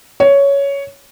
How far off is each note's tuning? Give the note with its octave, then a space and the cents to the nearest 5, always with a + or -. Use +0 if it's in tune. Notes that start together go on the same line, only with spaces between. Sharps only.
C#5 +10